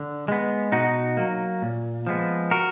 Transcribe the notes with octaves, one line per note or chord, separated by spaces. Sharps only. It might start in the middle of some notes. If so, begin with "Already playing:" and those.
Already playing: D3
G#3 B3
B2 D#4 F#4
F#3 A#3
A#2
F3 G#3 B3
F#4 A#4